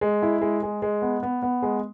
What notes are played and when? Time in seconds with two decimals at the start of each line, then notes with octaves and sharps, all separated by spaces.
0.01 G#3
0.22 E4
0.41 G#3
0.63 G#3
0.82 G#3
1.02 B3
1.23 B3
1.43 B3
1.62 G#3